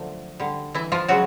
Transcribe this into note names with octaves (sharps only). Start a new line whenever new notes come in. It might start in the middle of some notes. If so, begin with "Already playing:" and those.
Already playing: D3 F3 F#3 A3
D3 G3
E3 E4
F3 F4
C#3 F3 F#3 G#3 F#4